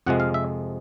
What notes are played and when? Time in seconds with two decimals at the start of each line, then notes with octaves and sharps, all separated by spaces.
0.06 F2 C3 F3 G#3 F#5
0.20 F5
0.34 E5